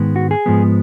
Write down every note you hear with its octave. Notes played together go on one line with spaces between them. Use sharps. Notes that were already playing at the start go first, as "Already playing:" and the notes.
Already playing: G#2 D#3 G#3 B3
F#4
G#4
G#2 F3 G#3 B3